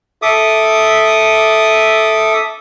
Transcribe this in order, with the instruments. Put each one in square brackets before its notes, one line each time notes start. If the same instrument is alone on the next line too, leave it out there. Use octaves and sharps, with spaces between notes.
[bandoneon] A4 E5 D6 D#6